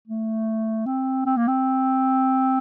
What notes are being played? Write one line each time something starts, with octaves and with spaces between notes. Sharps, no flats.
A3
C4
C4
A#3
C4